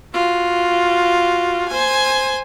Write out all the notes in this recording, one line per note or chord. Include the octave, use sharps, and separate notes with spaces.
F4 F#4
C5 G#5